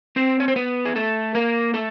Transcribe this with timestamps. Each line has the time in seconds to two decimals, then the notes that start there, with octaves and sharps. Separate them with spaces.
0.16 C4 C5
0.40 C#5
0.48 C5
0.56 B3 B4
0.85 G#4
0.96 A3 A4
1.35 A#3 A#4
1.74 A3 A4